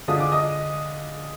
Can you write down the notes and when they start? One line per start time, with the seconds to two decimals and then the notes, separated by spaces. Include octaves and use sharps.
0.08 D3 G#3 D4 F4 D#6
0.20 D6
0.32 D#5 D#6